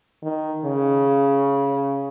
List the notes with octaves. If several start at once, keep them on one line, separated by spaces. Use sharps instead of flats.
D#3
C#3